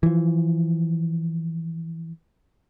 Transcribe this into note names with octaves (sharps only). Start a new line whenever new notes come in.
E3 F3